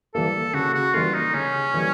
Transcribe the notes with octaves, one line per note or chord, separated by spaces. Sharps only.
E3 G3 A#3 A4
C#3 F#4
F#4
E3 G3 A#3 F4
D#4
C#3 C#4
E3 G3 A#3